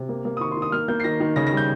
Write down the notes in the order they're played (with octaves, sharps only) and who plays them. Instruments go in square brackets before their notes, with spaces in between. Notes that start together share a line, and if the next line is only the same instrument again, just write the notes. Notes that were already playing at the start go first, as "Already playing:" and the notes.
Already playing: [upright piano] C3
A#3
A#3
D#6
D#3 C#6
C6
D#3
D#6
A#3 F6
A#3 G6
C7
D#3 A#6
D#3
C#3 A#6
A#6
G3
G6